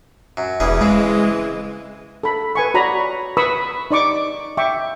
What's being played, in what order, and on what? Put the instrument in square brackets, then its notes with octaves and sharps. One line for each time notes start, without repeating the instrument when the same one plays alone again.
[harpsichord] F#2
[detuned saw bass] E1 [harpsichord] E2 G3 G#4 [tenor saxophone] E3
[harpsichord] C#3 C4 [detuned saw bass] G#3
[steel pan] A4 B5
B4 G#5 C#6
F#4 C#5 D5 A#5 B5
B4 B5 C#6 D#6 E6
D#4 D5 C#6 D6
E5 G5 C#6 D6